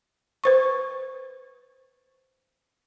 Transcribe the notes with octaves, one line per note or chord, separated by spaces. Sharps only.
B4 C5 C#6